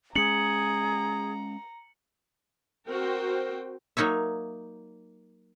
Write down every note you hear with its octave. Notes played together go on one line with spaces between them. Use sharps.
G#3 C#4 G#4 A#5 C#7 F#7
C4 F#4 A#4 C5 G5
F#3 A#3 D#4 C#5 E5